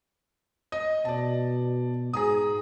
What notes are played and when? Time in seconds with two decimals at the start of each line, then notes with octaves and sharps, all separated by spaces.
0.72 D#5
1.05 B2 D5 A5
2.13 G#2 G#4 A#5 D#6